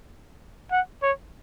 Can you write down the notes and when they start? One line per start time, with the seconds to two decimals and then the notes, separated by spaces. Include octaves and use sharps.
0.71 F#5
1.02 C#5